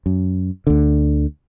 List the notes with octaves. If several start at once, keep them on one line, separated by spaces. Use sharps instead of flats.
F#2
D2 D3